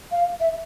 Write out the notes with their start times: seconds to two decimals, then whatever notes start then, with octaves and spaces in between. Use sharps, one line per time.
0.12 F5
0.40 E5